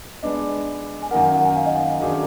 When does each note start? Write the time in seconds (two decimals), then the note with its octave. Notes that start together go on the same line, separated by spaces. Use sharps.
0.23 G#3 B3 D4 D#5
1.02 G#5
1.11 F#2 D#3 A#3 D#4 A#4 F#5
1.22 F#5
1.34 F#5
1.45 G#5
1.56 F5
1.66 D#5
1.76 F5
2.00 F#2 D#3 F#3 D4 G#4